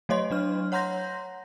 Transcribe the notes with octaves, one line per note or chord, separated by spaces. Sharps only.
F#3 A3 C#5 D#5 C6
F#3 D4 F6
C#5 F#5 A#5 C6 G6 A#6